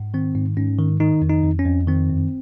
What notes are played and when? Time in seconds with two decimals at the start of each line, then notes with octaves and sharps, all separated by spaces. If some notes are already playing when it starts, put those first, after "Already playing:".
Already playing: G#2
0.14 D#3 C4
0.35 G#2
0.57 G#2 C#4
0.79 D#3
1.00 D#3 D#4
1.22 F2
1.29 D#4
1.44 F2
1.59 C#4
1.66 F2
1.87 D#3 C4
2.10 F#2